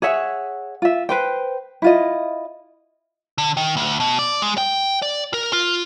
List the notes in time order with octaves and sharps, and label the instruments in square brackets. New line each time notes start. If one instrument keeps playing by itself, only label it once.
[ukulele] G#4 C#5 E5 F#5
F4 E5
B4 C5 G5
E4 F4 D#5
[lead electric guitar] D3
D#3
D2
B2
D5
G#3
G5
D5
A#4
F4